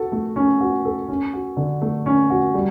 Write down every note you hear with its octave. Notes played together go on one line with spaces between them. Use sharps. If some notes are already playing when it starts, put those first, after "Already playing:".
Already playing: F#4 A4
A3
C#4
F#4
A4
C#4
F#4
D3
A3
C#4
F#4
G3